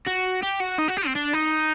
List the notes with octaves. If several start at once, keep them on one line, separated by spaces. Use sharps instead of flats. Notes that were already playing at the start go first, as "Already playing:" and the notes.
F#4
G4
F#4
D#4
F#4
G4
C4
D4
D#4